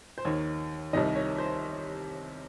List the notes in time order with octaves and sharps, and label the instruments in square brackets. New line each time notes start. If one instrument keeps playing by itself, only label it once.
[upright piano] C5
D#2 D#3 C#5
C2 C3 D#3 D#5
C#5
C5